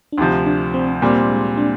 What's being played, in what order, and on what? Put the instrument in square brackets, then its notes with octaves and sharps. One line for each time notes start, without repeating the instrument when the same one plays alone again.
[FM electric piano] D4
[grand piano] D2 C3 F3 [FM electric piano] D#4
[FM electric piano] D4
C4
[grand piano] A#2 G3 C4 [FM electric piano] A#3
[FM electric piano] G#3
D4